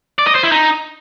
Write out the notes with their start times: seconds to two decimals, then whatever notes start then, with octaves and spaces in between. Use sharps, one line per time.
0.19 D5
0.27 D#5
0.35 C5
0.43 E4
0.52 D#4